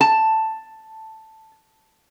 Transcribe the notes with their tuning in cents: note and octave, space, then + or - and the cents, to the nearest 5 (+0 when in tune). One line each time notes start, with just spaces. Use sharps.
A5 +5